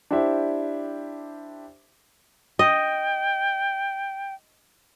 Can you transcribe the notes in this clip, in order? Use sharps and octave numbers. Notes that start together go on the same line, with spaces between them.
D4 E4 G4 C5 E5
D#5 G5